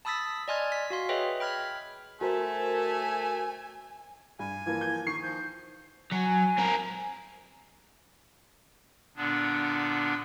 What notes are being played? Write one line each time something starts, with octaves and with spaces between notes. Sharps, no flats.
A5 B5 D#6 E6 A6 B6
D5 D#5 G#5 C6 F6 G#6
B6
F#4 F5 C6
G#4 B4 C#5 D#5 E5 G5
G5 B5 F6 G#6 B6
A3 F#4 A#4 C5 G#5
G2 G#5
E3 F3 A#3 G#6
G6
D#3 C#6 C7
F3 G6
F#3 G#5
C4 A#4
A#2 D3 B3 D4